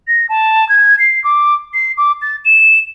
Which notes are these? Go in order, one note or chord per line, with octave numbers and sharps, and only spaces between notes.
A#6
A5
G#6
C7
D6
C7
D6
A6
E7